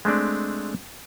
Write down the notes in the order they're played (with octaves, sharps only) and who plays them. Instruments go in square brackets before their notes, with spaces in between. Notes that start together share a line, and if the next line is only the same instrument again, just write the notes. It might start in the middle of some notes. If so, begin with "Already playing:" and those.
[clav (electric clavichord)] G#3 A3 C4 D4